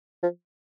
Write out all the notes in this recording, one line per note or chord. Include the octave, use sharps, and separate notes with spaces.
F3